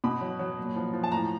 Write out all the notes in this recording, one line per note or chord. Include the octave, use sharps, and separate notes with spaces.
B2 B5
F#3
F#3
A#2
F3
F3
A5
A2 A#5